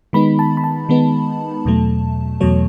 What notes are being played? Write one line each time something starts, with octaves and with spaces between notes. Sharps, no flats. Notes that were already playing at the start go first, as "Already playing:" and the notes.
D#3 G#3 B3 D#4 B5
A5
B5
A5
D#3 G#3 B3 D#4
E2 B2 F#3 A3
E2 B2 F#3 A3 C#5